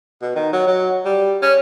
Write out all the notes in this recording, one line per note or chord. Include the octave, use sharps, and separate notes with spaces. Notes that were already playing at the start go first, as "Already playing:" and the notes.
B2
D#3
F#3
F#3
G3
C#4